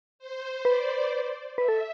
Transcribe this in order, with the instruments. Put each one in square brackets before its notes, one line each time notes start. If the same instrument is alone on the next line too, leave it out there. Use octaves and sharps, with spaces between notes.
[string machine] C5
[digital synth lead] B4 [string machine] D5
[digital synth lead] B4 [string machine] E5
[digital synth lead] A4